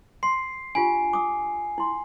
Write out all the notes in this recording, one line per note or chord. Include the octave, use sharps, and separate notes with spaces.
C6 C7
D4 F4 G4 G#5
D6 D#6
E4 C6